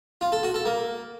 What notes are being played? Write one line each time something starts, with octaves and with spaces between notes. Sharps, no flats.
F4
A4
F#4
A4
A#3